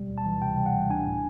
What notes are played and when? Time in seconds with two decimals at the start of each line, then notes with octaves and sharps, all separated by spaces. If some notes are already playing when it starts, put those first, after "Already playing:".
Already playing: B2 G3
0.09 D2
0.18 A5
0.26 E3
0.42 C3 G5
0.58 G3
0.66 F#5
0.74 D2
0.90 D4 G#5
1.07 A2